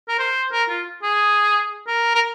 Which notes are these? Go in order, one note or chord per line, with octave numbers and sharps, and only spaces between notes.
A#4
C5
A#4
F4
G#4
A#4
A#4